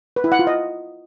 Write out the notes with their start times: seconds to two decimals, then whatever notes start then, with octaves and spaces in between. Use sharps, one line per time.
0.16 B4
0.24 E4
0.32 F#5
0.39 F4
0.47 D#5